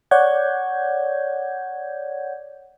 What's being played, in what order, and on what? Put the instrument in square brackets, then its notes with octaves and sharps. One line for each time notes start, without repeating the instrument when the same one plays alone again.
[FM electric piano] C#5 D5 F#5 G6 G#6